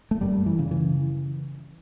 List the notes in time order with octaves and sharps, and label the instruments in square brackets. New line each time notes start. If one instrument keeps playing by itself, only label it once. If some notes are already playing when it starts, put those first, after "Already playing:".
[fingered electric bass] A3
F#2 G3
E3
C#3
E3